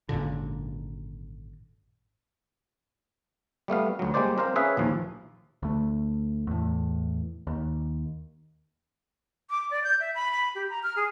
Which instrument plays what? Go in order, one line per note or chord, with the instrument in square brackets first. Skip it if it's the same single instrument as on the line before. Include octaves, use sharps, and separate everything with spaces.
[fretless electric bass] G#1 F#2 A#2 D3
[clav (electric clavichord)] G3 A3 B3 F5
D2 F#3
G3 G#3 A#3 C5 D5
C4 A#4 C5 F5
C#4 G#4 B4 E5 F5
A#1 D#2 F3
[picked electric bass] D2 A3
E2 A2
D#2
[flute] D6
D5
G6
E5
B5
B5
G4
A#5
F6
G#4